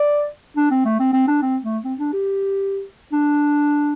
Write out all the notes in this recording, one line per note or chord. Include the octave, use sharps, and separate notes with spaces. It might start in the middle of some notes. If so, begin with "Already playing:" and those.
Already playing: D5
D4
C4
A3
C4
C4
D4
C4
A3
C4
D4
G4
D4